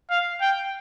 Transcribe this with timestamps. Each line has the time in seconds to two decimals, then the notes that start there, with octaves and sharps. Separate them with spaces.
0.10 F5
0.41 G5